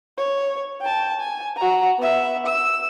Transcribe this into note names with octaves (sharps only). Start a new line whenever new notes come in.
C#5
G5 A5
G#5
F#4 A#5
B3 E5
E6